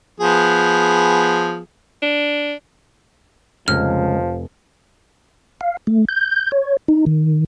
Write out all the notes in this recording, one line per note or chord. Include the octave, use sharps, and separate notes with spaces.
F3 B3 G#4
D4
F1 C#2 F3 F6
F5
A3
G6
C#5
D#4
D#3